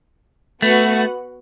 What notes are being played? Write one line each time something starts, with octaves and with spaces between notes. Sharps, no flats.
A3 B3 F#4 B4 F#5